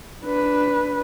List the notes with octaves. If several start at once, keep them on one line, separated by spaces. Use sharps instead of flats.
D4 B4